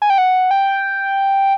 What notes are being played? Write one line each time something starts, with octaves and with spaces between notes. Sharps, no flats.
G#5
G5
F#5
G5